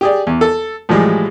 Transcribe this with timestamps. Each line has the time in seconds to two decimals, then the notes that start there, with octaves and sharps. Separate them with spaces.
0.01 G4 G#4 D5
0.27 E2
0.41 A4
0.89 A2 E3 F3 G3 G#3